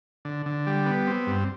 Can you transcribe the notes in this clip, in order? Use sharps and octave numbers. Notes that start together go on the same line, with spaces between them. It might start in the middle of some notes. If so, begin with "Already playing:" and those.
D3
D3
G3
B3
C4
G2